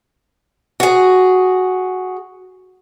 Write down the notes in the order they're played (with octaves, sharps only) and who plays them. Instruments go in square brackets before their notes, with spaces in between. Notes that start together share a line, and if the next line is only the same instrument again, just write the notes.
[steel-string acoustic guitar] F#4 G#4